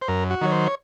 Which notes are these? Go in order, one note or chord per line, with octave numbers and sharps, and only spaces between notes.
C5
F#2 A#4
F#4
D#3 F#3 C#5
C5
C#5